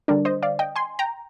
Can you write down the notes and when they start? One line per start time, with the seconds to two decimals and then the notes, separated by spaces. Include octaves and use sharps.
0.08 D3 G3 D4 A#4 D5
0.25 C5 D#5
0.43 D5 F5
0.59 D#5 G5
0.76 G#5 C6
0.99 G5 A#5